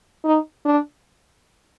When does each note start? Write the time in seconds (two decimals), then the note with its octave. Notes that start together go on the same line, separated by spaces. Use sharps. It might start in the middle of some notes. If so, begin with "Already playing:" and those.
0.24 D#4
0.65 D4